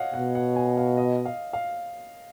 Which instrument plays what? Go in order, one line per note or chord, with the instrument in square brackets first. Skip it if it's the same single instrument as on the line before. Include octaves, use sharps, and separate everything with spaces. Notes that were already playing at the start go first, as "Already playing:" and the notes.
Already playing: [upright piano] C#5 D#5 F5 F#5
[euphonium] B2 [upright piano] F#5
[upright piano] F#5
G#5
F5
D#5
F5
F5